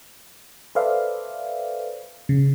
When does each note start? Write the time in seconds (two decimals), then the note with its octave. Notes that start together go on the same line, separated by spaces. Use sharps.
0.75 A4 B4 C5 D5 E5 F5
2.29 C#3